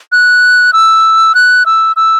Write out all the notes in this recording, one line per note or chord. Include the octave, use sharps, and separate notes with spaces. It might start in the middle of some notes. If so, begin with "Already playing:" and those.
F#6
E6
F#6
E6
E6